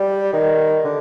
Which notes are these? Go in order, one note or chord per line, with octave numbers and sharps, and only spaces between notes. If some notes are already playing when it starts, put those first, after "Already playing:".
Already playing: G3
D#3
D3